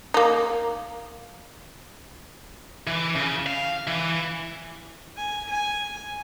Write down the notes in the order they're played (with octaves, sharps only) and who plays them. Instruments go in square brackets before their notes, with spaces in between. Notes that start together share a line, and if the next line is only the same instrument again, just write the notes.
[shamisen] A#3 D#4
[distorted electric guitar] E3
C#3
F5
E3
[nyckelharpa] G#5
G#5